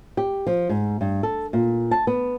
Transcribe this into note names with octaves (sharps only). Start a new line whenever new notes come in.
G4
F3
G#2
G2
A4
A#2
A5
B3